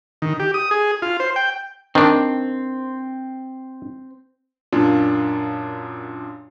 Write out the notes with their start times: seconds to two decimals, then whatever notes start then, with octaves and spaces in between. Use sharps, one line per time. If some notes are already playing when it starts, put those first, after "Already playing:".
0.22 D#3
0.40 G4
0.54 D#6
0.71 G#4
1.02 F4
1.20 C5
1.36 G5
1.95 D#3 C4 D4
4.72 F#2 A#2 D4 F4